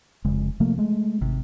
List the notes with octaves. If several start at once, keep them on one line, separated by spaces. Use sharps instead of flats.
F1 C#3 G#3
C3 F3 A3 A#3
G#3 A3
G#1 C3